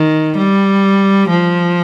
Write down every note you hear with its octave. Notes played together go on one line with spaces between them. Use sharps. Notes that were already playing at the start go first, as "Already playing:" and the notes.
Already playing: D#3
G3
F3